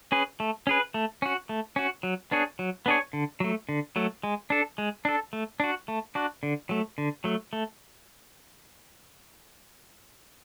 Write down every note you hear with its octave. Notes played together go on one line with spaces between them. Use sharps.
C#4 G#4 B4
A3
C#4 G#4 B4
A3
C#4 F#4
A3
C#4 F#4
F#3
B3 D4 G#4 C#5
F#3
B3 D4 G#4 C#5
D3
F#3 A3
D3
F#3 A3
G#3
D4 A4
G#3
D4 A4
A3
D4 F#4
A3
D4 F#4
D3
F#3 A3
D3
F#3 A3
A3